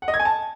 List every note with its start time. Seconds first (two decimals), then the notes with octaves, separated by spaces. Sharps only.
0.02 F#5
0.08 D#5
0.14 G#6
0.20 G#5
0.25 A5